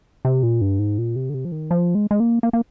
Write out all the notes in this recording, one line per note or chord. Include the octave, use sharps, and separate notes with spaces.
C3
A#2
G2
G#2
A#2
C3
D3
C3
F3
D#3
F3
G#3
G#3
A#3
A#3
A#3